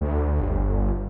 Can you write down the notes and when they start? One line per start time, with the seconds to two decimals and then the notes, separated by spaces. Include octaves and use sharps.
0.01 D2
0.41 G1